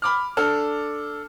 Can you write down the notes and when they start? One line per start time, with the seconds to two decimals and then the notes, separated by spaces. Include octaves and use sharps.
0.02 B5 D6 F6
0.37 D4 A4 F6